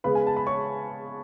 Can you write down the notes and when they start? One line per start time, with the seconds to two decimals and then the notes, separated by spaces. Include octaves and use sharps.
0.04 C#3 G#3 B3 B4 B5
0.15 G#5
0.27 A5
0.37 B5
0.47 C#5 C#6